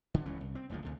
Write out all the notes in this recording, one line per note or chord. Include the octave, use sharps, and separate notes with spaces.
D3
C#2 E3 C#4
C2
C4
F#1 D2 G#2 F3
D2 C3